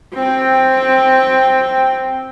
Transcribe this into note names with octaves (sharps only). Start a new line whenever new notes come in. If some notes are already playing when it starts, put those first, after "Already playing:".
C4 G5